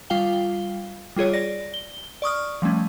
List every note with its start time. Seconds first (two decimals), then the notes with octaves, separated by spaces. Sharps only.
0.10 G3 F4 F5 G5 G7
1.16 G3 F4 G#4 C#5
1.33 D5 A#6
1.74 G7
2.22 D5 C#6 D#6 F6
2.62 F3 G3 A3 C#4